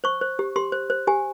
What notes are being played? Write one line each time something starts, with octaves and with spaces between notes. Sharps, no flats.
C5 C#6
C5
G4
G4 C6
C5
C5
G4 G#5